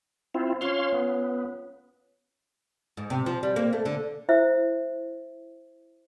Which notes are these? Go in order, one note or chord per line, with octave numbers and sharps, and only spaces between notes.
C4 E4 F4
C#4 F4 C#5 E5 F5 C6
B3
G#2
C3
F3
G3
A#3
A3
D3
E4 C5 E5